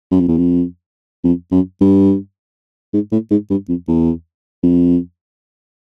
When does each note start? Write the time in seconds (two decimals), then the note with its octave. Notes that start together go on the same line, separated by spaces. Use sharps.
0.11 F#2
0.20 F2
0.28 E2
0.37 F2
1.24 F2
1.52 F#2
1.81 G2
2.93 G#2
3.12 A2
3.31 G#2
3.50 G2
3.69 F2
3.88 E2
4.63 F2